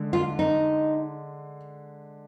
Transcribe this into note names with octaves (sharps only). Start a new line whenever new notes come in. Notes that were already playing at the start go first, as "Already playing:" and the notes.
Already playing: D3 G#3
F4
D#4